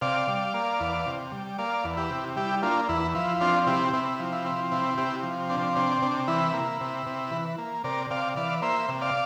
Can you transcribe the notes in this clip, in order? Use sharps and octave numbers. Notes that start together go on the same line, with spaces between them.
C3 D5 F5
G3
A#3
E2
C3
G3
A#3 D5 F5
E2
E4 G4
C3
G3 E4 G4
A#3 D4 F4
E2 E4
F3 E4
C4 D4 F4
C3 E4 G4
C3 E4
F3
E4
C4
C3 E4
C3 E4 G4
F3
C4 D4
C3 D4
C3 D4
E3 E4
A#3
C3
C3
E3
A#3
C3 A#4 D5
C3 D5 F5
E3 D5 F5
A#3 C5 E5
C3
D5 F5